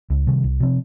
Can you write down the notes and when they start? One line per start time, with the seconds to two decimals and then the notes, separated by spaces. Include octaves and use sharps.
0.10 C#2
0.27 C3 D#3 G3
0.44 C2
0.60 C3 F3 C4